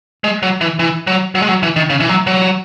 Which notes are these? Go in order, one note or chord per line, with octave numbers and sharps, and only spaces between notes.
G#3
F#3
E3
E3
F#3
F#3
G#3
F#3
E3
D#3
C#3
E3
F#3
F#3